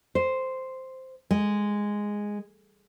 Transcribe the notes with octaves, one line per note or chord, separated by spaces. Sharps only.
C5
G#3